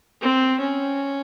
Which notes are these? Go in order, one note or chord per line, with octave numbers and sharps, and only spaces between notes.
C4
C#4